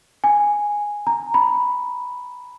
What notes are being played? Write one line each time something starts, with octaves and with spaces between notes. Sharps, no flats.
G#5
A#5
B5